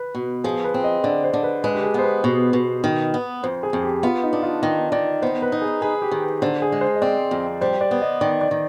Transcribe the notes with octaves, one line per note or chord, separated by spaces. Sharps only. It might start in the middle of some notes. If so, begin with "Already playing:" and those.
Already playing: B4
B2
F3 G#4
B4
C4
D#5
D3 D5
C5
D3
B4
G#3 B4
G4
G#4
B3 C5
B4
B2
B2
D#3
B3
F2 C5
G#4
F2
G4
B3 F4
D#4
D4
F4
D#3 D#5
D#3 D5
B3 C5
B4
D#4
G#4
G#4 B4
G4
D#3
D3 C5
G#4
G#3
C5
D#5
C4 D5
F2
G3 C5
D5
B3
D#5
D#3 D5
D5
D#3